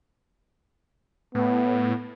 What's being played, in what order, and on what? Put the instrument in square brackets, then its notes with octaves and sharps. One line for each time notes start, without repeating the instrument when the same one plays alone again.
[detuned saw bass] A2 [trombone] B3